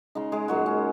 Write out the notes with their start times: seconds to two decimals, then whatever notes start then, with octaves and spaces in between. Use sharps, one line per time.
0.15 C#3 G#3 D#4
0.32 G#3 G#4
0.48 A#2 F#3 G#3 F#4
0.66 C#4